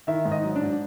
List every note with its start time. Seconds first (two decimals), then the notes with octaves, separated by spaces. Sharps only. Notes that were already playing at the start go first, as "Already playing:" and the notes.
0.07 D#3 E4 E5
0.25 G#2
0.32 D#4 D#5
0.44 F#3
0.55 D4 D5
0.62 G#2